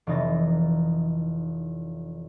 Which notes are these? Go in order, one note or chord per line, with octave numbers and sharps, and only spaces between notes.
F1 E3 D#4 A6 A#6